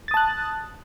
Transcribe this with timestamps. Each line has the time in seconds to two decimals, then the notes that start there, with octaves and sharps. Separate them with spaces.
0.08 A6
0.11 D#6
0.14 A5
0.17 F#6